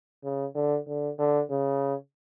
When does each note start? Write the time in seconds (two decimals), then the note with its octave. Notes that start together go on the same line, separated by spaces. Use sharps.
0.24 C#3
0.55 D3
0.87 D3
1.19 D3
1.50 C#3